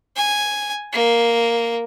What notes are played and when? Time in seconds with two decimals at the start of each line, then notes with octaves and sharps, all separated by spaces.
0.16 G#5
0.93 A#3